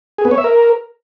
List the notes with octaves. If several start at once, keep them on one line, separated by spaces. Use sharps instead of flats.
G#4
B3
C#5
E5
A#4